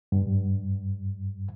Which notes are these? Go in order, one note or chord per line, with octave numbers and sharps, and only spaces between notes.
G2